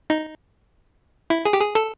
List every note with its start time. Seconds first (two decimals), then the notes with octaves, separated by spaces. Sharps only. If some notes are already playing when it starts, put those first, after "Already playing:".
0.10 D#4
1.30 E4
1.45 G#4
1.53 G4
1.60 G#4
1.75 A4